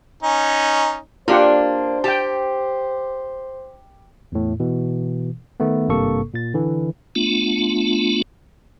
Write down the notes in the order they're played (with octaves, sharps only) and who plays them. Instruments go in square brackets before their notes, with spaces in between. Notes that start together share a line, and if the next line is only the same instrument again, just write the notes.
[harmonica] C#4 D#4
[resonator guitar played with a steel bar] A#3 D4 [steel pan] F4 G4 F#5 [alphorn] C5
[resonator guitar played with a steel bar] G4 [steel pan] G5 A5
[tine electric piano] E2 A2
B2 E3
D#3 A3 B3
G#1 G2 C3 A#3 A4 C#6
A#2 A6
D3 E3
[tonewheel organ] A3 B3 D4 F4